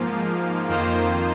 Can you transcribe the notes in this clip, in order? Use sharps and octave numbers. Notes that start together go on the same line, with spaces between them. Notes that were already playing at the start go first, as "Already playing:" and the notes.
Already playing: G#2 F3 A#3 F4
F2 D#3 A#3 F4 C5